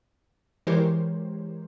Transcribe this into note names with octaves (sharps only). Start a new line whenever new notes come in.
E3 G#3 G4 A#4 C5 C#5